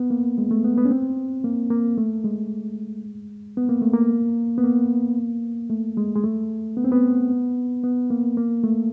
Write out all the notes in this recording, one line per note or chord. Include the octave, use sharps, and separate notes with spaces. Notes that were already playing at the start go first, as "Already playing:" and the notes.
Already playing: B3
A#3
G#3
A3
B3
B3
C#4
C4
A#3
A#3
A3
G#3
B3
A#3
A3
A#3
B3
A#3
A3
G#3
G#3
A3
B3
C4
B3
B3
A#3
A#3
A3